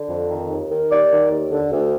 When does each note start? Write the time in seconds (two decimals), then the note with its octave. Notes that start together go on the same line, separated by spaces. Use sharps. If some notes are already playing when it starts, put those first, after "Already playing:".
Already playing: D3
0.09 F2
0.30 D#3
0.50 D#2
0.70 D#3
0.90 D#2 D5
1.11 D#3
1.31 D#2
1.51 D3
1.72 D2